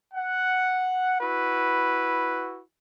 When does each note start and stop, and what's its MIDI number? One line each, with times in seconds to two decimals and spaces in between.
0.14 1.17 78
1.20 2.61 64
1.20 2.61 66
1.20 2.61 71